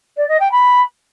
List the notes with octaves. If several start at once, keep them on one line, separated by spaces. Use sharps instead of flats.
D5
D#5
G5
B5